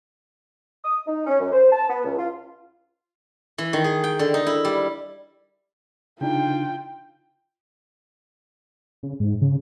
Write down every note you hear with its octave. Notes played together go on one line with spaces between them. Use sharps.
D#6
D#4
C#4
F#2
C5
A5
B3
C#2
F4
E3
D#3
G#4
G5
D3
D#4
E4
G3
C#3 D4 D#4 F4 G5
C#3
G#2
C#3